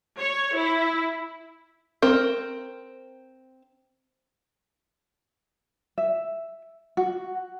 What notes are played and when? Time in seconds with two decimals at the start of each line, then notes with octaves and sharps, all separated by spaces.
0.19 C#5
0.57 E4
2.02 C4 A#4
5.98 E5
6.97 F#4